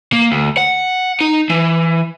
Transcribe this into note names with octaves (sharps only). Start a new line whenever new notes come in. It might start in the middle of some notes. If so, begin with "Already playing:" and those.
A#3
D2
F#5
D#4
E3